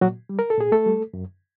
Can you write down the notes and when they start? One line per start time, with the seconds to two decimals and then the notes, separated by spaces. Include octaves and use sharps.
0.01 A#2 F#3 F#4
0.29 G3
0.39 A#4
0.50 A4
0.57 A#2 G#4
0.72 A3 A4
0.86 G3
1.14 F#2